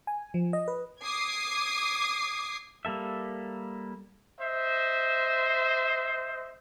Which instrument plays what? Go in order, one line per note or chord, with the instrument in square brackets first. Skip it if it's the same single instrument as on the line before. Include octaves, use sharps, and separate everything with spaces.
[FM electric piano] G#5
F3
D#5
B4
[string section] D6 D#6 G#6 C7
[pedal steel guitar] G3 A#3 A4 E5
[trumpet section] C5 D#5 E5